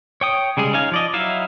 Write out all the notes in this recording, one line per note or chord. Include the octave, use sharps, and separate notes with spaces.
C#5 G5 D#6
C#3 G3 G#3 G#4
C#4 D#4 F5 G#5
F3 D5 D#5
F#3 D#4 E4 E5 F5